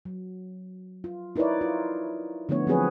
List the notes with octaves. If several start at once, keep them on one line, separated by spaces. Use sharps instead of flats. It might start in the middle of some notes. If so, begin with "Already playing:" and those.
F#3
F4
D#4 E4 A#4 B4 C#5 D5
F4
D3 F3 A3 B3 C#5
F3 F#3 C4 G#4 B4 C#5